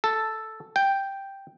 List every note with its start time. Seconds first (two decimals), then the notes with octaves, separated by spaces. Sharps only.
0.04 A4
0.76 G5